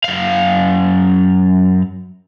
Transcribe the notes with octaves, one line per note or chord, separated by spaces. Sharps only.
F#2 F5